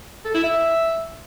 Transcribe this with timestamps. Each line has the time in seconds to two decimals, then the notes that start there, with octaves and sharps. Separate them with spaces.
0.25 A4
0.34 E4
0.44 E5